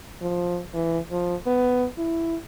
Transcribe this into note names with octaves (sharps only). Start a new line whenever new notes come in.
F3
E3
F3
B3
E4